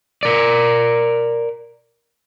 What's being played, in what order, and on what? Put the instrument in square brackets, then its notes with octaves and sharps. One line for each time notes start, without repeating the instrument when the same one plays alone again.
[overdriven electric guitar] A#4 D5